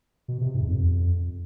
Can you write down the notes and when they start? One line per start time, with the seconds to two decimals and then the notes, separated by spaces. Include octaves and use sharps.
0.28 B2
0.41 C3
0.55 G#2
0.61 E2
0.67 F2